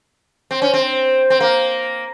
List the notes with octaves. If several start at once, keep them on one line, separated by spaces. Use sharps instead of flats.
C4
C#4
C4
C4
A#3